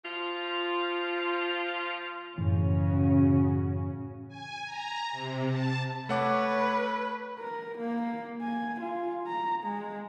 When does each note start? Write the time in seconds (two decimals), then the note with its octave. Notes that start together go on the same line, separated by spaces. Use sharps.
0.05 F3 F4
2.38 F#2 A2 C#3 E3 C#4 F#4
4.28 G#5
4.65 A#5
5.11 C3
5.48 A5
6.09 A3 B4 C#5 F#5 D6
7.40 A#4
7.79 A#3
8.42 G#5
8.81 F4
9.27 A#5
9.63 G#3